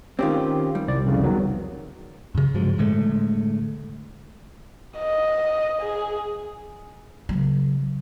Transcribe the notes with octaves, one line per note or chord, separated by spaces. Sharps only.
D#3 C4 C#4 F4 G4
G3
C2 D5
C2 F2 C#3
D#3 F#3 B3
F#2 C#3
G2 F3 F#3 G#3
A2 D3 G#3 A3
D#5
G#4
C#3 F#3